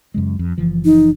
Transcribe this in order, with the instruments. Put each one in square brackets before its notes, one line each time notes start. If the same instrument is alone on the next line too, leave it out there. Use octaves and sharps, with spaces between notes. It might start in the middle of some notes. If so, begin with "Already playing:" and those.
[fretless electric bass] F#2 C#3 G#3
F2
F#1 E3 F3
[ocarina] D#4